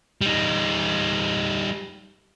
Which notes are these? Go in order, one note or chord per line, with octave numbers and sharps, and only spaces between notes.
G3 D#4